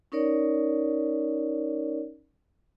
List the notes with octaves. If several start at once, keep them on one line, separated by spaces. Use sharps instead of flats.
C#4 D#4 A#4 C#5 D5